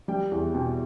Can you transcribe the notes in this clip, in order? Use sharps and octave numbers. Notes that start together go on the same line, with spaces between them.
G3 G5
E2
B2 G5